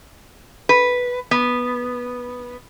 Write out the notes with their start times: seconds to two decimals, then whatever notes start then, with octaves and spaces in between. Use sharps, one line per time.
0.69 B4
1.31 B3